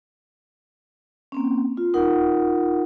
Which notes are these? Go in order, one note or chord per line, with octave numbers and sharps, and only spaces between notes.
A#3 C4 C#4
F4
D#4 F4 A#4 F#5